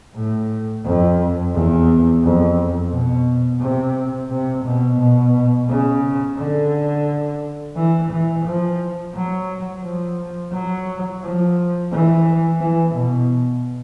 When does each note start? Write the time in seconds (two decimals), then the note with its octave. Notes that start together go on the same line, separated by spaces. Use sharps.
0.15 A2
0.85 F2
1.54 E2
2.23 F2
2.92 B2
3.61 C3
4.30 C3
4.65 B2
4.99 B2
5.69 C#3
6.37 D3
7.76 E3
8.11 E3
8.46 F3
9.15 F#3
9.84 F3
10.53 F#3
11.22 F3
11.92 E3
12.60 E3
12.95 B2